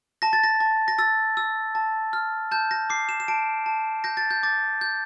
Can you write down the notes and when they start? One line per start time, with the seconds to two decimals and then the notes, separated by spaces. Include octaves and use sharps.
0.22 A5 A#6
0.33 A6
0.44 A#6
0.60 A5
0.88 A#6
0.98 E6 A6
1.37 E6
1.75 A5
2.13 F6
2.51 A5 G6
2.71 A#6
2.90 D6 C7
3.09 E7
3.20 E7
3.28 A5 D7
3.66 A5
4.04 G6 A#6
4.17 A6
4.31 G6
4.43 D6 A6
4.81 G6